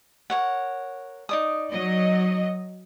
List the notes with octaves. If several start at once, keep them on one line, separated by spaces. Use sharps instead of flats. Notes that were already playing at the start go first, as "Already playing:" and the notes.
A#4 C#5 F#5
D#4 D5 D#6
F#3 D#5